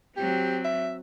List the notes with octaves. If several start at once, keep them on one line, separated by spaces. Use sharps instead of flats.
F#3 C4 G4
E5